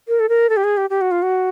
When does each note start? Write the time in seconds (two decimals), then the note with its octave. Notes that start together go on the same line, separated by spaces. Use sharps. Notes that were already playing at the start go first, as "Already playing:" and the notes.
0.08 A#4
0.20 A4
0.29 A#4
0.50 A4
0.57 G4
0.64 G#4
0.77 G4
0.90 G4
1.01 F#4
1.11 F4
1.22 F#4